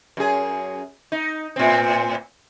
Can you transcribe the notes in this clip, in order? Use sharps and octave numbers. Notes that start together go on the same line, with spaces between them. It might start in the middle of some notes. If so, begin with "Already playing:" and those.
F#2 G#4
D#4
A2 C4